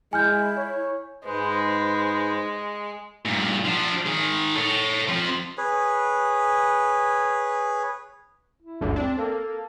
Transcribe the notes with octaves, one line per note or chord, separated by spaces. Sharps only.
G#3 E4 G#5 F6 G6
C#5
G#2 G#3 B4 C5
G2 A#2
F3 D4
D#3 G#4
A4 C#5
F3 C4
G#4 B4 C#5
E4
G1 D2 D3
C4 D4
A#3 A4